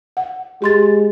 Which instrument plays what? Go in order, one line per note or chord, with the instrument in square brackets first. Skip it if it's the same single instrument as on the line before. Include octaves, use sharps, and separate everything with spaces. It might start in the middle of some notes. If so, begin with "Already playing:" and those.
[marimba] F#5
[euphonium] G#3 [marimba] G4 C6 A6